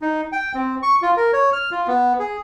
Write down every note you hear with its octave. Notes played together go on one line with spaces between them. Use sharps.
D#4
G5
C4
C#6
F4
A#4
C#5
F6
F4
B3
G#4